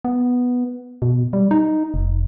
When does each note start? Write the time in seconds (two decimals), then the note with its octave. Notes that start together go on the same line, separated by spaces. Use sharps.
0.05 B3
1.02 B2
1.33 G3
1.51 D#4
1.94 F1